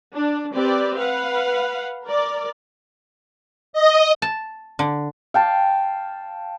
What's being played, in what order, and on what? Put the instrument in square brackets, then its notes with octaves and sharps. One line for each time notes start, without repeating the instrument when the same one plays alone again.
[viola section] D4
C4 G4 B4 D5
B4 F5 F#5
A#4 D5
[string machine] D#5
[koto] A5
D3
[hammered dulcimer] F5 G5 A5